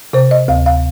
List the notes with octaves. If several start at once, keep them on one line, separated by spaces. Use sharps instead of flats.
C3 C5
D#5
D2 F5
F5